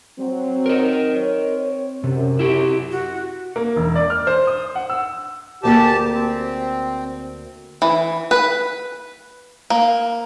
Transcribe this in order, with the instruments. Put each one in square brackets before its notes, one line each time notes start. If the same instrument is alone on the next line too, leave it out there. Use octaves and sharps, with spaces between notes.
[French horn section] F#3 C4
[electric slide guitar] A#4 D#5
[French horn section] C4 C#5
[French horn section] F#2 [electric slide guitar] C3
[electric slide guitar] E4 G4
[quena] F#4
[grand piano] A#3
E1
D5
F6
C5
D#6
F#5
E6
[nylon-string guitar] D2 A#3 G#4 [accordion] G4 A5
[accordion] C4
[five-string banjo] E3
B4
A#3